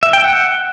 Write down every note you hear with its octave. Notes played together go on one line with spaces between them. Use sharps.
E5
G5
F#5